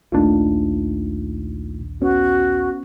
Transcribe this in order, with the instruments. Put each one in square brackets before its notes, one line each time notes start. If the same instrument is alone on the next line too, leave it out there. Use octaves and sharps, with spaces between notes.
[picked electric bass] A#1 D#2 D4 [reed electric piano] A3 D#4 F4
[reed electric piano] B3 C#4 [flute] F#4